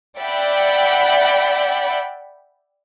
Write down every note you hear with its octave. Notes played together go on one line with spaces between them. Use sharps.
D5 E5 F#5 G5 B5